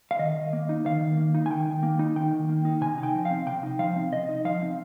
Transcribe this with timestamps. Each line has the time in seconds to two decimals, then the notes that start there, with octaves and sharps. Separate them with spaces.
0.11 F5
0.19 D#3 D#5
0.36 D#3
0.53 A#3
0.69 D#4
0.86 D#3 F5
1.01 D#3
1.17 A#3
1.35 D#4
1.46 G#5
1.50 D#3 G5
1.68 D#3
1.83 A#3
1.99 D#4
2.16 D#3 G5
2.33 D#3
2.49 A#3
2.65 D#4
2.81 C3 G#5
2.98 D#4
3.03 G5
3.14 F3
3.25 F5
3.31 C4
3.46 C3 G5
3.63 D#4
3.79 F3 F5
3.96 C4
4.12 C3 D#5
4.29 D#4
4.45 F3 F5
4.62 C4